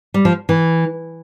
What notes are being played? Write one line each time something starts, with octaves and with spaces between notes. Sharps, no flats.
G3
F3
E3